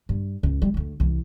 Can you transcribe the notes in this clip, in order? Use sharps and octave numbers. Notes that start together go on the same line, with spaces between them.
G2
C#2
G3
D2 A3
C2 E3